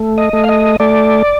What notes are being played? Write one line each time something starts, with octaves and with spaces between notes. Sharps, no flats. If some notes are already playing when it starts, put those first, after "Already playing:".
Already playing: A3
D#5
A3
F5
D#5
A3 D5